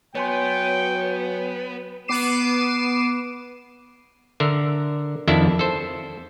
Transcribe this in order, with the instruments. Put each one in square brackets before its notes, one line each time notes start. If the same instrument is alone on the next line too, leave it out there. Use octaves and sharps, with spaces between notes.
[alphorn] F#3 [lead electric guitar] B3 [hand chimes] C#5 G#5 C6 [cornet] G5
[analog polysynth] B3 D6 C7 D#7 E7
[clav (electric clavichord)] D3 A#4 E5
F2 D#3 D4 E4 A4 E5
A4 C5